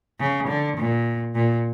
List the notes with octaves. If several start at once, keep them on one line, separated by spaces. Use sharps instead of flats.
C#3
D3
A#2
A#2